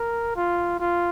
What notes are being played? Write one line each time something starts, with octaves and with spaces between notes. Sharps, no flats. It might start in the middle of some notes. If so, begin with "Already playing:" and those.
Already playing: A#4
F4
F4